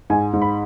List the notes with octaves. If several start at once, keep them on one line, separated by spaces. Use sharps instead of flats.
G#2 G#5
G#2
B5